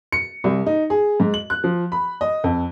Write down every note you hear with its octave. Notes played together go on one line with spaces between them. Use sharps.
C#7
C2
D#4
G#4
G#2
F#7
F#6
F3
B5
D#5
F2